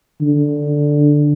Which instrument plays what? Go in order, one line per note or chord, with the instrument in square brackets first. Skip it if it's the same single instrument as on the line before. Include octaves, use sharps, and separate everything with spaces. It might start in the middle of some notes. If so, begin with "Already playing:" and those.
[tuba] D3